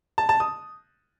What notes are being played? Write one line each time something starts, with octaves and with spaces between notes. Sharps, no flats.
A5
A5
D#6